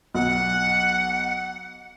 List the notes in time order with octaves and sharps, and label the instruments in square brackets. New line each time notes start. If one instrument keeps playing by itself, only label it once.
[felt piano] B1 [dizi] F#5